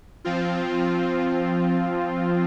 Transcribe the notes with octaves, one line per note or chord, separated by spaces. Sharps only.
F3 C4 F4